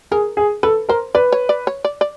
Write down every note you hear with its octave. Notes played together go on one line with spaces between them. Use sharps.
G#4 A#4
G#4
A4 B4
A#4 C5
B4 D5
C#5
D5
C#5
D5
D5